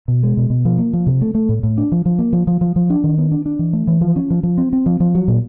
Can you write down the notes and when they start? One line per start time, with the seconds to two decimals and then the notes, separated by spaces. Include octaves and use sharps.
0.08 B2
0.23 G#3
0.37 B2
0.50 B2
0.65 F3
0.78 A#3
0.93 F3
1.07 C3
1.21 A3
1.35 A3
1.49 A2
1.63 A2
1.78 D4
1.92 F3
2.06 F3
2.19 A#3
2.33 F3
2.47 F3
2.61 F3
2.76 F3
2.90 D4
3.04 D#3
3.18 B3
3.31 D4
3.46 D4
3.59 E3
3.73 A3
3.87 E3
4.01 F3
4.16 C#4
4.30 F3
4.43 F3
4.58 C4
4.73 C4
4.86 F3
5.00 F3
5.15 F#3
5.28 A#2